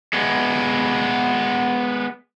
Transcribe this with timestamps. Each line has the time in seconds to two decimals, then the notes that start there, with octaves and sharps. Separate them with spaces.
0.13 G#3 B3